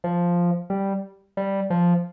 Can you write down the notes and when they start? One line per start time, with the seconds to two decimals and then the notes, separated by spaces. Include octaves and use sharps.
0.04 F3
0.70 G3
1.37 G3
1.70 F3